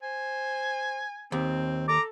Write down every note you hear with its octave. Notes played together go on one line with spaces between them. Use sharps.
C5 G#5
D#2 C4
A4 A#5 D6